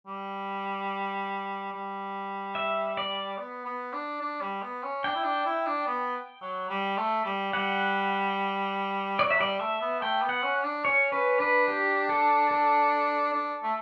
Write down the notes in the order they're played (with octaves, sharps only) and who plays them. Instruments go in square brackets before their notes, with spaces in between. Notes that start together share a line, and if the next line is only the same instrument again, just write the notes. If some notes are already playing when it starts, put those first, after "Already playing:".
[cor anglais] G3
G3
[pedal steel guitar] E5
D5
[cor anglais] B3
B3
D4
D4
G3
B3
C#4
[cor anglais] D4 [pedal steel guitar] G5
[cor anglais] E4
D4
E4
D4
B3
F#3
G3
A3
G3
[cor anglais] G3 [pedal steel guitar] F#5
[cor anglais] F#3 [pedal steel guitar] D5
[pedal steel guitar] E5
[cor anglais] G3 [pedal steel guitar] D5
[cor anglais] A3 [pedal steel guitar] E5
[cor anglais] B3
[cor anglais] A3 [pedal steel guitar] G5
[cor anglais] B3
[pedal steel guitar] F#5
[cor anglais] C#4
D4
[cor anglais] C#4 [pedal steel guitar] C#5
[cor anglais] C#4 [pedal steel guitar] B4
[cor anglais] D4 [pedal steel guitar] B4
[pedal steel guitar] G4
A4
A4
[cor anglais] D4
A3